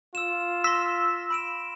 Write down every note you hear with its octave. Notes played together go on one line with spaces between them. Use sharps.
F4 E6 E7
C6 E6 A#6 B6
B5 D7 E7